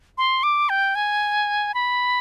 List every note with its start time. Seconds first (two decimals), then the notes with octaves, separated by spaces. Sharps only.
0.18 C6
0.43 D6
0.69 G5
0.95 G#5
1.74 B5